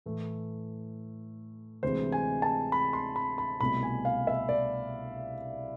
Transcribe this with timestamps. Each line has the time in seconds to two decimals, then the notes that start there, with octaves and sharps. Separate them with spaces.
0.06 A2 E3 A3
1.83 D2 C3 E3 G#3 C5
2.12 G#5
2.42 A5
2.72 B5
2.93 C6
3.16 B5
3.38 B5
3.60 C2 B2 A3 B5
3.83 G#5
4.05 F5
4.27 E5
4.49 D5